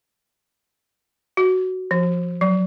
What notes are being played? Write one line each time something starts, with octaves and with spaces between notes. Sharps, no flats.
F#4
F3
F#3